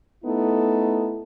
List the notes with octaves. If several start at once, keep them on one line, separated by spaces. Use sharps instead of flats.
A3 B3 D#4 E4 A4